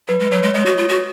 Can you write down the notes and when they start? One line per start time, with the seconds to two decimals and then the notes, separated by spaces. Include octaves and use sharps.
0.08 F#3 B4
0.20 G#3
0.31 F#3 C#5
0.43 G#3
0.54 G#3 D#5
0.63 F#4 C#5
0.70 D#5
0.77 F4
0.89 F#4